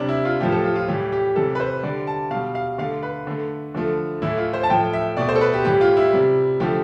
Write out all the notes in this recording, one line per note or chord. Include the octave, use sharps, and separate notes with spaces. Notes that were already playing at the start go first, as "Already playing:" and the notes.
Already playing: C3 G3 D4
E4
F4
A2 F3 A3 G4
A4
F4
F4
A2 E3 G3 G4
G4
C3 E3 G3 A4
B4
C5
D3 G3 D5
A5
B2 G3 F5
F5
D3 A3 F5
B4
D3 A3
D3 F3 A3
A2 E3 A3 E4
F4
C5
A5
A2 F3 A3 G5
E5
B2 A3 D5
C5
A4
B4
G4
A2 E3 G3 G4
F4
E4
C3 G3
D3 F3 A3 G4